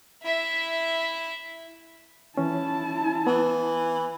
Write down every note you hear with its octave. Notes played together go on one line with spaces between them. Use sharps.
E4 E5
E3 C#4 E4 A5
E3 B3